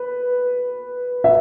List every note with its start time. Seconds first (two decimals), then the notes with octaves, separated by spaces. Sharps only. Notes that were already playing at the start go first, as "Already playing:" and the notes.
Already playing: B4
1.24 E5